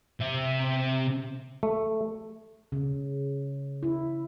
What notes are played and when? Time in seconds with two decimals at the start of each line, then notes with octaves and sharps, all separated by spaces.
0.20 C3 E5
1.63 A3
2.72 C#3
3.83 E4